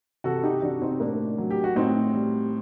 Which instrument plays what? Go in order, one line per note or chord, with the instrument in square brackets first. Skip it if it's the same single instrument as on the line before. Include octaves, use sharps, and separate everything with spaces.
[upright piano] C3 F#4 A4
D#4 G4
C3 D4 F#4
C4 D#4
A2 A#3 D4
F#3
G4
F#4
A2 C4 D#4
G3